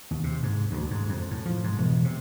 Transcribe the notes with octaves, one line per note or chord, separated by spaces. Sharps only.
D#2
C3
G#2
D2
G#2
F2
A2
F3
G#2
E1
C3